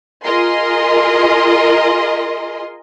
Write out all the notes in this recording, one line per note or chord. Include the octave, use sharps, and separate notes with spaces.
F4 G#4 A#4 D#5 C6